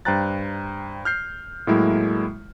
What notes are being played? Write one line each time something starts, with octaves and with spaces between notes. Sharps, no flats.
G2 C5 G5 A#5 F#6 A6
F6 G6 C7
A2 F#3 G#3 A#3 E4